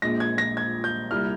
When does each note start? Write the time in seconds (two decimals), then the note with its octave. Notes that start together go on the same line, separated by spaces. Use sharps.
0.02 A#1 A#2 G#3 A#6
0.20 G#6
0.38 A#6
0.57 G#6
0.84 G6
1.11 C2 A#2 G3 F6